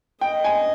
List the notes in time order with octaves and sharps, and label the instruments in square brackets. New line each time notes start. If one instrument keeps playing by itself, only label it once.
[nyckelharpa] D#5 [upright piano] G5
[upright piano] G#5